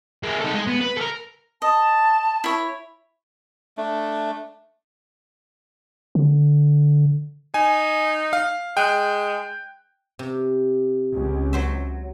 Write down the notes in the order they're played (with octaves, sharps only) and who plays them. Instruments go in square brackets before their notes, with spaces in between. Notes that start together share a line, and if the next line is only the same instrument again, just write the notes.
[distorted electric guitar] A#3 G#4
D#4 A4
G#3
B3
B4
A4 A#4
[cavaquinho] D#5 [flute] A5
[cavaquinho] E4 C#5
[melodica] A3 D4
[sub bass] D3
[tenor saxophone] D#4 [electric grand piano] G#5
[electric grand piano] F5
[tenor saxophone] G#3 [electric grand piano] G5 F#6
[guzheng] C3
[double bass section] C#2
[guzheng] F#3 C5 E5